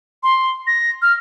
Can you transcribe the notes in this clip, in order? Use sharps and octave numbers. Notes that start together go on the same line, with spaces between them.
C6
A#6
F6